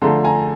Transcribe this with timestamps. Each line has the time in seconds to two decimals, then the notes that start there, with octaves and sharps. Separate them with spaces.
0.02 D3 F3 A3 A#5 C6
0.24 G#5 A#5